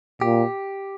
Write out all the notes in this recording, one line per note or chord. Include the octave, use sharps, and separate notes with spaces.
A#2 G4